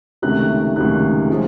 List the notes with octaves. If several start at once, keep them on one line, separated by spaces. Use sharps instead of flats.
C#2 C3 D#3 F#3 A3 F#6
C#2 C3 D#3 F#3 A3 F#6
F3 G#3